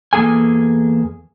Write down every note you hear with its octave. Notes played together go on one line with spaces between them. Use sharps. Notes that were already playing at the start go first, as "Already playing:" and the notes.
E2 A#3 G#4 A4 G#5